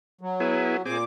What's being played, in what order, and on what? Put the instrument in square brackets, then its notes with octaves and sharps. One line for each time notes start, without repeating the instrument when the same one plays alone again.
[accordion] F#3
[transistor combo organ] B3 E4 G#4
[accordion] A#2 D6 [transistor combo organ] C4 G#4